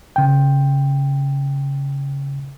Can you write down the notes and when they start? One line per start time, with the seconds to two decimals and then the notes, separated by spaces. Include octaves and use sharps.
0.16 C#3 G5